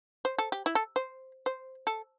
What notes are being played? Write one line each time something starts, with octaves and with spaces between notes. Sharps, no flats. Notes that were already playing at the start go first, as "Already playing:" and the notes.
C5
A4
G4
E4
A4
C5
C5
A4